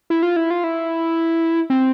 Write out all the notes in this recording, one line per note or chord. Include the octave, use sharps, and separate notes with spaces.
E4
F4
E4
F4
E4
C4